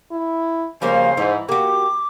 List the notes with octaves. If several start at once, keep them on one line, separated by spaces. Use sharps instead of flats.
E4
C#3 F3 G3 A#3 C5
G#2 E3
A#3 F#4 G4 D6